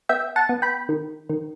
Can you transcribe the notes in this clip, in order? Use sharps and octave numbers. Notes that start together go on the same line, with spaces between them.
B3 E5 G5
F#5 A5
B3
G5 B5
D#3
D#3